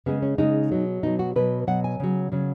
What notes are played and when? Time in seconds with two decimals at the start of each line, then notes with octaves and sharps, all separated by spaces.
0.06 C#3 G#3 B3
0.22 C#4
0.38 C#3 G#3 D#4
0.72 B2 F#3
1.03 B2 F#3 D#4
1.19 F#4
1.36 B2 F#3 B4
1.67 B2 F#3 F#5
1.84 G#5
2.00 C#3 F#3
2.32 C#3 F#3